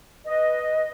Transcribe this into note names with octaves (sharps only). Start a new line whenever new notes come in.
B4 D#5